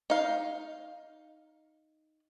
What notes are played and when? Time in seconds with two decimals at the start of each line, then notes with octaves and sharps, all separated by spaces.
0.10 D#4 F5